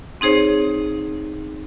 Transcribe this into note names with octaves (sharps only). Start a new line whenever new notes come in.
C4 D#4 G#4 C5 C#5